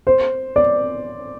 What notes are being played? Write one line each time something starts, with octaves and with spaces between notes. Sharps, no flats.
C5
D5